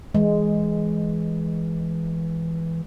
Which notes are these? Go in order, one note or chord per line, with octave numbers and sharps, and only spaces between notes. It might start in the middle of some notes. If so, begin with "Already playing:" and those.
E3 G#3